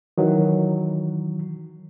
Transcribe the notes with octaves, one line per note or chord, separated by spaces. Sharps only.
D#3 E3 F#3